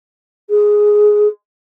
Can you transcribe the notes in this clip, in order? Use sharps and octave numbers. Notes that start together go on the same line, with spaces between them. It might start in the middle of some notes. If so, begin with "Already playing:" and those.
G#4